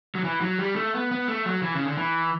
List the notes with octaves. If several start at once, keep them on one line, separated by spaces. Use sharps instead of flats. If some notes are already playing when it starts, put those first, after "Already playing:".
F#3
E3
F#3
G3
A3
B3
B3
A3
F#3
E3
C#3
D3
E3